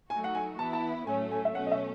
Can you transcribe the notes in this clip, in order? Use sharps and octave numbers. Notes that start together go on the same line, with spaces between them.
F#3 A3 D#4 F#4 G#5
F#5
G#5
E3 B3 E4 A5
A5
A2 F#3 A3 C#4 G#5
G#5
E5
B2 A3 C#4 F#5
D#5
E5